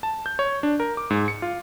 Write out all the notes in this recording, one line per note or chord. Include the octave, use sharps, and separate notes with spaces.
A5
G6
C#5
D4
A#4
D6
G#2
C#7
F4